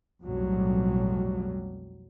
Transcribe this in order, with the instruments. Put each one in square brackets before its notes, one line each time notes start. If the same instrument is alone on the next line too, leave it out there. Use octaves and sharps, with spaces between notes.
[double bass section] B1 F2 A2 F#3 G3